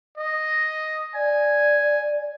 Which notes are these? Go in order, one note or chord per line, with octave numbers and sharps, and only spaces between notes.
D#5
D5 G#5